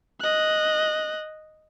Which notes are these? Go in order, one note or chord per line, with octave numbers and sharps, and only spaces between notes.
D#5 F#6